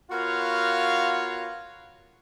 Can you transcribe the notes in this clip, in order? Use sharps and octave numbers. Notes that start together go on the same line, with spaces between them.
B3 F4 F#4 A#4 C#5 F5